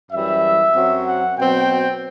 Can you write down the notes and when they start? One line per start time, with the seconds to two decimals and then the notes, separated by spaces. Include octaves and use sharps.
0.12 F#2 E3 G3 E5
0.75 F#2 F#3 C4
1.07 F#5
1.38 B2 F#3 C4 G5